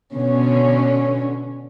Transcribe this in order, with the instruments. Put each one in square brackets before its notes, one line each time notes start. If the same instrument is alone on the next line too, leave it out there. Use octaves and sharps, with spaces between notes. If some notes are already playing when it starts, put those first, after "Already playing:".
[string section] B2 D3 C#4